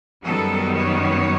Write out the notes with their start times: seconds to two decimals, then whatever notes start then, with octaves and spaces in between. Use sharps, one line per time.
0.23 F#2 D#3 G3 B3 A4
0.75 C#5